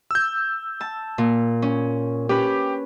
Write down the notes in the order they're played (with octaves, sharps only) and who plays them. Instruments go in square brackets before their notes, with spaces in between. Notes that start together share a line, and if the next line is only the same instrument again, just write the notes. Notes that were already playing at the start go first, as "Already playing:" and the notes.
[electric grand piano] E6 G6
[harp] A5
A#2
C#4
[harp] C#4 B4 [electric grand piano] G4